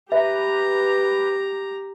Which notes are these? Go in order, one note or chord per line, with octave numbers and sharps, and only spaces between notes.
G4 B4 E5 A#5